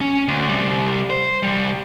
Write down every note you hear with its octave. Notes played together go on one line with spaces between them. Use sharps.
C#4
D2
C3 G3
C5
C3 G3